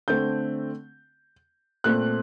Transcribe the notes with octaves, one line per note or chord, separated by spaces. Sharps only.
D3 A3 C4 G6
A#2 A3 C4 F#6